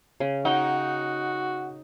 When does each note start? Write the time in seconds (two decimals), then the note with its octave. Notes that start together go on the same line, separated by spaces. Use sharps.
0.20 C#3
0.45 D#4 F#4 F#5 G5